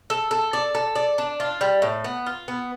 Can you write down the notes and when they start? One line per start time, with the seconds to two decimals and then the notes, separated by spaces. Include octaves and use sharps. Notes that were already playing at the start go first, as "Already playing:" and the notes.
0.10 A4
0.31 A4
0.53 D5
0.75 A4
0.96 D5
1.18 D4
1.40 F4
1.61 G3
1.82 A2
2.04 B3
2.26 F4
2.48 B3